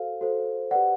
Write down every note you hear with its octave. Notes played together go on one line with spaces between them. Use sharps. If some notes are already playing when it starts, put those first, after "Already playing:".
Already playing: F#4 A4 C5 F5
F#4 A4 C5
G4 B4 D5 F#5